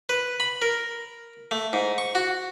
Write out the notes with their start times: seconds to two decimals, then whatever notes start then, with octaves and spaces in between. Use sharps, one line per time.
0.09 B4
0.40 B5
0.62 A#4
1.51 A3
1.73 G#2
1.98 C#6
2.15 F#4